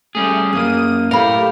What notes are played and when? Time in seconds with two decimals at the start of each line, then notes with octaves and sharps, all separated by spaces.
0.15 G3 A3 C#4 G#4
0.53 F#2 A#3 G#4 D#6 D#7
1.11 A2 A3 G4 A#4 F5 B5